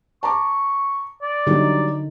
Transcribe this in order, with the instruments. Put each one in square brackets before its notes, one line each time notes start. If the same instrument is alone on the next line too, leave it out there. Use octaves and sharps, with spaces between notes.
[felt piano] A5 A#5 D6 [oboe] C#6
[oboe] D5
[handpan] D3 D#4 [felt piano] F#3 G3